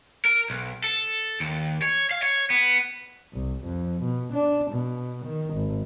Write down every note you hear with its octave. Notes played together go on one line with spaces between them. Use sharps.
A#4
B1
A4
D#2
C#5
F5
C#5
B3
C2
F2
B2
D4
B2
D#3
G#1